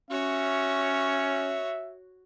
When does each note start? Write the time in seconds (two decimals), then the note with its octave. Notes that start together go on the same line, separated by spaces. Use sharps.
0.10 C#4 F#4 C#5 E5